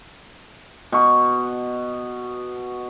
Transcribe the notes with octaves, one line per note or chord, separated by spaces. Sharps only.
B2 C#6